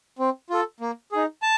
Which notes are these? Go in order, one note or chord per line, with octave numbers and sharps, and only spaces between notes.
C4
F4 A4
A#3
D#4 G#4
A5